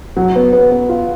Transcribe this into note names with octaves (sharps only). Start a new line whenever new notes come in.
F#3
B3
B3
B3
F4